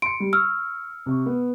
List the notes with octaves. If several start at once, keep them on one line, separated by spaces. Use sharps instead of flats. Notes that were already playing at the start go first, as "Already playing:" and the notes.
C6 C#7 D7
G3
C#6 E6 F6
C3 C#6
B3